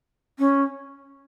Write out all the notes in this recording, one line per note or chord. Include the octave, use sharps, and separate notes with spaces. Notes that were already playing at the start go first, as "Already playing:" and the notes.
C#4